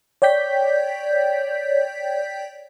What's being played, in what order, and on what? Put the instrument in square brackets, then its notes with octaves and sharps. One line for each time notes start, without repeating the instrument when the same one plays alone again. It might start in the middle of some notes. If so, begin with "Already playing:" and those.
[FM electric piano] C#5 D5 G5 G6 B6